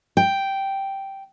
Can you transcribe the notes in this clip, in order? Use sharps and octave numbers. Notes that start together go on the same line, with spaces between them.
G5